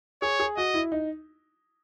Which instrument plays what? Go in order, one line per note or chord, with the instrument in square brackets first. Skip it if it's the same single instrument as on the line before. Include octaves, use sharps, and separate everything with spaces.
[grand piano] G#4 [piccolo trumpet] C#5
[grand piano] G#4
[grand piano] F#4 [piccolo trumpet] D#5
[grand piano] E4
D#4